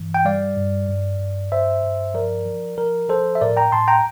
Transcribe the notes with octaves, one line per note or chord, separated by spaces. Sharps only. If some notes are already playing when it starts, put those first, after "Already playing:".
Already playing: G2 E3
G5
G3 D5 F5
G2
G2
G2
G2 C5 E5
G2
F3 A#4 D5
F3
F3 A#4
F3 A4 C5
E5
A2 A#4 D5
G5 A#5
A2 A5 C6
G5 A#5